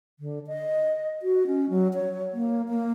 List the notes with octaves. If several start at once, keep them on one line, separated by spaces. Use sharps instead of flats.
D3
D#5
F#4
C#4
F#3
C#5
A#3
A#3